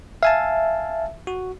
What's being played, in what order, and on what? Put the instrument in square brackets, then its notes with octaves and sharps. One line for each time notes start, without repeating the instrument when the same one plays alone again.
[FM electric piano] E5 [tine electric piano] F5 G#5 A5
[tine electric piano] F#4